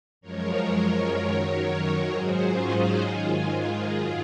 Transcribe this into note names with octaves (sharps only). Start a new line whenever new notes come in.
F#2 F3 G#3 A#4 C#5
F#2 D#3 F#3
G#2 F#3 G#4 C5
C#4 F4
D#4 F#4
G#2 D#3 G#3 F4 G#4
F#2 D#3 F#3